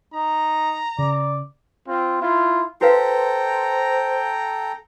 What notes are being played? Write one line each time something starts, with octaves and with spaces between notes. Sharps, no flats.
D#4 A#5
C#3 D5
C4 F4
E4 F4
F#4 A4 B4 C5 F5 G5 A#5